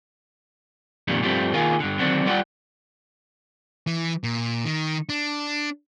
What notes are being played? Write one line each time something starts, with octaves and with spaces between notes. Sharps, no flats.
F2 A#2 D#3 G3
G2 F3 G3 A3 C4
D#3 A#3 F4 G#4
G2 D3
D3 D#3 F#3 C4 D4
G3 F4 B4 D5 F#5 G5
E3
A#2
D#3
D4